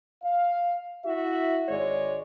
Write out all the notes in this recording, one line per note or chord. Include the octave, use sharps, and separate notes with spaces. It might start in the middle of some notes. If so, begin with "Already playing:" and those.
F5
E4 F#4 E5
G#1 G#3 C#5 D5